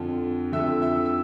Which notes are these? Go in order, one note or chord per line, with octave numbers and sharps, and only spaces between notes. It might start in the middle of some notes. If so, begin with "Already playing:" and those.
Already playing: F2 D3 F3
F2 D3 F3 E5 E6
E5 E6
E6